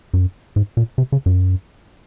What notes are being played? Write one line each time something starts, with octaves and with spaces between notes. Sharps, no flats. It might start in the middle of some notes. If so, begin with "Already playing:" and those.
F#2
G#2
A#2
C3
C#3
F#2